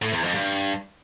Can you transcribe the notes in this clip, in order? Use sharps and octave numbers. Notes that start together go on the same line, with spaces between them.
A2
E2
F2
G2